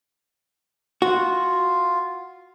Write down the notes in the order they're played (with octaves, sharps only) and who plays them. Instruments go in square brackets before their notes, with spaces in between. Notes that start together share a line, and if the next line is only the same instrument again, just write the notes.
[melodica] F4 [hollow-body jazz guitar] F#4